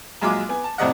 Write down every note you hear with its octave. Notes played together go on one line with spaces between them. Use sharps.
A#1 F#3 G#3 F4 G#5 D6
B3 G#5
A5
F2 A2 C3 D5 D#5 F#5